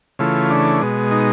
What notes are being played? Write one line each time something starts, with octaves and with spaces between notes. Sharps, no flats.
C#3 E3 A3 F4
D4
B2 G#3
D#4